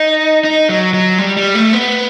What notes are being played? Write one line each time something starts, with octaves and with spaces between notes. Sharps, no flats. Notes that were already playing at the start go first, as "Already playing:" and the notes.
Already playing: D#4
D#4
F#3
F#3
G3
G3
A3
B3